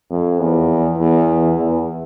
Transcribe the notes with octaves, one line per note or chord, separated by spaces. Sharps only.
F2
E2
E2
E2